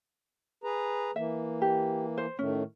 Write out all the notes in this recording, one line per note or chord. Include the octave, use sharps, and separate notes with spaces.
G#4 B4 A#5
E3 A#3 E5
G4
C5
A2 D#3 A3 C#4